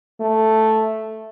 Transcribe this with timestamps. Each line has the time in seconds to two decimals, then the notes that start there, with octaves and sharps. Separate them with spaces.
0.20 A3